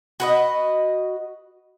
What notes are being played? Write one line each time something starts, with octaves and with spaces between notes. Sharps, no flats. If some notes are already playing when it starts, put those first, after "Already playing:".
F#4 B4 D#5